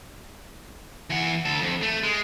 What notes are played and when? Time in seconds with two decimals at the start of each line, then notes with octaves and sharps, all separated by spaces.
1.10 E3 F#5
1.45 D2 A4
1.61 F2
1.82 A3
2.03 G#3